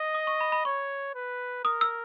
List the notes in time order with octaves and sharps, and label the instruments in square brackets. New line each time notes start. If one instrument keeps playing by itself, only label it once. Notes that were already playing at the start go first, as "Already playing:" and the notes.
Already playing: [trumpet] D#5
[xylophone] D#6
C#6
B5
B5
[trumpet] C#5 [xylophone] C#6
[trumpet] B4
[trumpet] A#4 [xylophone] D#6
[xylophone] E6